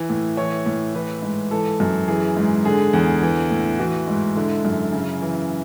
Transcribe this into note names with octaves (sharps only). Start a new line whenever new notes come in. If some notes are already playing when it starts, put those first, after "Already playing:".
Already playing: E3
A2
E3 C#5
A2
E3 B4
G#2
E3 A4
F#2
E3 G#4
G#2
D3 G#4
E2
E3
A2
E3 F#4
G#2
D3 E4
F#2
C#3
E3